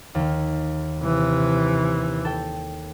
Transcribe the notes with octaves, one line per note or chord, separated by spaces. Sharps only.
D#2 D#3
C3 E3
A4 G5